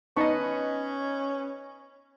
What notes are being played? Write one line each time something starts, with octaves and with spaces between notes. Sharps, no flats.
B3 C#4 D#4 B4 D#5 A5 C#6